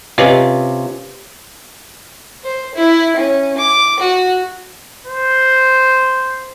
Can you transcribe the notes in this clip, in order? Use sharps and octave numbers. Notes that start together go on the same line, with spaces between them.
C3 C#4 F4 G4 B4 D#5
C5
E4
C#4
D6
F#4
C5